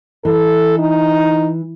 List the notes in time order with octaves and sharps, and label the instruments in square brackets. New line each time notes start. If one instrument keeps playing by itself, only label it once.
[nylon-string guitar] E3 [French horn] A4
[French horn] D#4